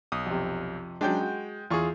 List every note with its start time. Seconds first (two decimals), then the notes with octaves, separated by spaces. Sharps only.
0.12 B1 D#6
0.26 F2 C3
1.01 F#3 G#3 C#4 D4 G5 G6
1.21 F#4
1.71 E2 F4 G#4 C#6